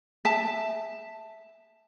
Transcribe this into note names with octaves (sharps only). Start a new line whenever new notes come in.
E5 A5